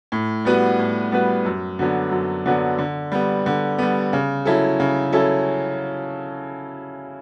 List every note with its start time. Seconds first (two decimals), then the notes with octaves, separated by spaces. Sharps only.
0.12 A2
0.45 G3 B3 F#4 B4
0.79 A2
1.12 G3 B3 F#4 B4
1.45 F#2
1.79 D3 F#3 B3 D4
2.11 F#2
2.46 D3 F#3 B3 D4
2.78 D3
3.12 G3 B3
3.46 D3
3.78 G3 B3
4.13 C#3
4.45 F#3 C#4 E4 A4
4.80 C#3
5.12 F#3 C#4 E4 A4